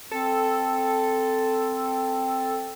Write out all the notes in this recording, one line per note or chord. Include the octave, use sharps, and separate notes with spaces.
C4 A4